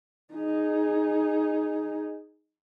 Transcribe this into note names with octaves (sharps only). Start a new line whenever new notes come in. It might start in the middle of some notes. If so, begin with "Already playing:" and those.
D#4 G#4